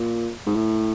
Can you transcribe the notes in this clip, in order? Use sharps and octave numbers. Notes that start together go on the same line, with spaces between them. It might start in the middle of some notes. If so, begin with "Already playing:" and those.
Already playing: A#2
G#2
A2